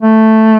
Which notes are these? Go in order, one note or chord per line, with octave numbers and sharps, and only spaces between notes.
A3